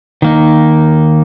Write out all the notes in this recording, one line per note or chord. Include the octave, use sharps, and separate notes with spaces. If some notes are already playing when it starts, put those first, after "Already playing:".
D#3 A#3 D#4